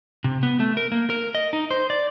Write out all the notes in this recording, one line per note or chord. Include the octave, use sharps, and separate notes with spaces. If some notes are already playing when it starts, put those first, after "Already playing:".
C3
B3
A3
A#4
A#3
A#4
D#5
D#4
C5
D5